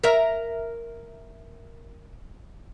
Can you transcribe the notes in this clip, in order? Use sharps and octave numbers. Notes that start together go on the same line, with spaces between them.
A#4 E5